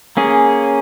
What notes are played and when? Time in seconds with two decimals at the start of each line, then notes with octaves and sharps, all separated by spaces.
0.17 A#3 C#4 G#4